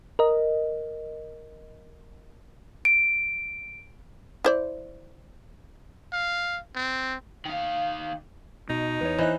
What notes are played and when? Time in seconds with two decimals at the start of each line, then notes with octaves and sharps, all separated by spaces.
0.19 A#4 D#5
2.85 D7
4.45 E4 C5 D5
6.13 F5
6.75 C4
7.45 D#3 F5
8.70 B2 D#4
9.01 E2 B4 C#5
9.19 E3 C5 D#5 F#6